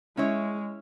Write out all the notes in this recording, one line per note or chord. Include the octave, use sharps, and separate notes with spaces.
G#3 C#4 E4 C#5